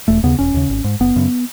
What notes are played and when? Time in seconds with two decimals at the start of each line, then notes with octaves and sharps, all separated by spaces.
0.08 E1 A3
0.23 D#2 C#3 B3
0.39 E1 C#4
0.54 D#2 C#3
0.70 G#1
0.84 G#2
1.00 F#1 B3
1.16 F#2 C#3